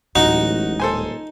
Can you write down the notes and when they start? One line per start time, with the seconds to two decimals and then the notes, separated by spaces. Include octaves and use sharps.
0.16 D1 A1 G#3 D#4 F#4
0.80 D#1 A4 C5 G#5